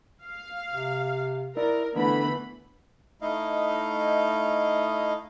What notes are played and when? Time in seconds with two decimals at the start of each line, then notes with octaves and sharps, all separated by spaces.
0.23 F5
0.70 C3
1.57 E4 A#4 D5
1.95 E2 D3 E3 A3 B3 B5
3.22 A3 D#4 E4 D#5 F5